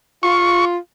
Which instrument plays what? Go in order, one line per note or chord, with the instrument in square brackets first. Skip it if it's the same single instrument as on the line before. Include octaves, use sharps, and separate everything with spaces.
[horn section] F4 [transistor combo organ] C#6